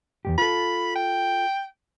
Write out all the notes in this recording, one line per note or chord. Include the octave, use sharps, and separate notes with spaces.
E2 G2 G4
F4 A4 B5
G5